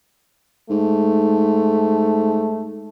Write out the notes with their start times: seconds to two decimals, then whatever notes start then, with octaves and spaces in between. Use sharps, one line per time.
0.70 G#2 A3